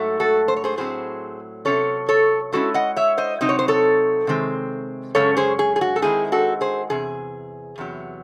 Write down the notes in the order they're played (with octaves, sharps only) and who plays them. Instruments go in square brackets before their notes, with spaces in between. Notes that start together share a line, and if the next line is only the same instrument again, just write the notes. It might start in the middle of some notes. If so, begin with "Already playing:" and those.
Already playing: [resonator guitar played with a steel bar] G#2 F#3 A3
F#4 A4
C5
C#5
G#4 C5
A2 F#3 C4 G#4 C5
C3 F#3 C#4 A4 C#5
A4 C#5
A2 G#3 C#4 E4 F#4 A4
D#5 F#5
C#5 E5
C5 D#5
C3 F#3 C4 D#4 D#5
C#5
C5
A4 C#5
C3 D#3 G#3 C4
F#2 C#3 G#3 C#4 A4 C#5
G#4 C5
G#4
G#4
F#4
A4
D#3 G#3 C4 E4 G#4
F#4 A4
G#4 C5
E2 C3 G#4
E2 C3 F#3